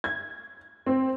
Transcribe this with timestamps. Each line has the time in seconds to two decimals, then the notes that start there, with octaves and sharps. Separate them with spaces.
0.04 G#6
0.86 C4